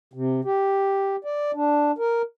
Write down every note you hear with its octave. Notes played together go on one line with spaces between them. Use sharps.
C3
G4
D5
D4
A#4